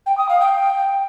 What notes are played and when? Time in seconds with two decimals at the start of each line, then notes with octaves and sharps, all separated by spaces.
0.06 G5
0.18 D#6
0.29 F5
0.41 G5